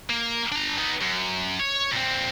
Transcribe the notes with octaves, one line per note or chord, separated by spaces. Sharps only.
A#3
D4 A#5
B3 D#4
F#2
C#5
A#2 C4